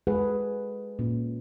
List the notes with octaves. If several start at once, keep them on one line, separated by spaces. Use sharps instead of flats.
G#3 G#4 A4 B4 F#5
A#2 C#4